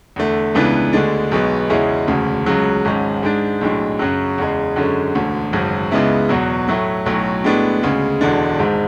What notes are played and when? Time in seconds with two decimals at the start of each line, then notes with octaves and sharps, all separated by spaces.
0.16 E2 D3 A3
0.55 C#2 C#3 E3 B3 D4
0.93 D2 D3 G#3 D4
1.31 B1 B2 G#3 B3
1.70 E2 C#3 G#3 C#4 E4
2.08 E1 D2 C#3
2.46 C#2 C#3 F#3
2.85 G#1 G#2 G#3 C#4
3.23 G#2 G#3 D4
3.61 B1 A2 G#3 D4
3.99 F#2 C#3 F#3
4.38 E2 C#3 G#3
4.76 F#2 D3 G#3 C#4
5.15 E1 D2 D3
5.53 G#1 F#2 C#3 F#3
5.91 C#2 C#3 G#3 B3 E4
6.29 E2 B2 F#3
6.68 A2 F#3 A3 E4
7.06 B1 A2 F#3
7.44 A2 G#3 B3 D4
7.83 D2 C#3 G#3
8.21 E1 E2 D3 G#3 D4
8.59 G#1 G#2 G#3